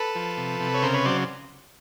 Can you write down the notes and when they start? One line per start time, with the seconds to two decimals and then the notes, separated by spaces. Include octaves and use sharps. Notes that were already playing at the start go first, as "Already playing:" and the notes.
Already playing: A4 B4
0.16 F3
0.37 C3
0.60 C3
0.74 C#5
0.83 C#3 A#4 C5
0.94 B4 C#5
1.05 F#3 C5 D5